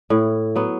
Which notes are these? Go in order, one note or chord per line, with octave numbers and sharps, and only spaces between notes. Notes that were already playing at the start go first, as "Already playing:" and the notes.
A2 E4
F#3 B3